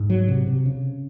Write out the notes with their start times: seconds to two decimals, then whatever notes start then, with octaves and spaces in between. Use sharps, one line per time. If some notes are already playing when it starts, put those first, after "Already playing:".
Already playing: G#2
0.10 F#3
0.28 C3
0.47 C3
0.66 C#3